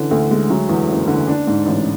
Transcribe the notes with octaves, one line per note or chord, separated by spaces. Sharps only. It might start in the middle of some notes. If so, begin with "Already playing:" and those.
Already playing: D3 E3 C#4
D2
G#3
F#3
E2
F#1
D3
D4
G#2
A1